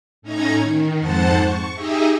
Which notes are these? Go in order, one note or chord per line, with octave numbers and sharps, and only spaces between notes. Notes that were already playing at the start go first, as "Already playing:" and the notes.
A2 C#4 D#4 A#5 G#6
D#3
F2 G#2 C5 F#5 A5 A6
C#6
D#4 G4 G#4 D#5 E5